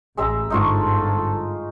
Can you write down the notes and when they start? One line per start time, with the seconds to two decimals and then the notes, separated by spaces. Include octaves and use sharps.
0.17 A1 G#3 E5 A#5
0.50 G1 G#2 D3 D#4 F4 A4 C#6